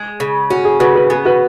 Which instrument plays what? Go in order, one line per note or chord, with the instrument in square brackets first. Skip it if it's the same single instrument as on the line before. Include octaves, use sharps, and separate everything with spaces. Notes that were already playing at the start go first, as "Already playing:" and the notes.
Already playing: [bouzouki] G#3
C#3
[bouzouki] C#4 [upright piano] F#4
[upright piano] G#4
[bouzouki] C#3 [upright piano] F#4 B4
[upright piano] F#4 B4
[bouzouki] B3 [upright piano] G#4
[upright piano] F#4 B4